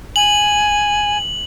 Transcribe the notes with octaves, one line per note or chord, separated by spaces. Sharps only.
G#5 F#7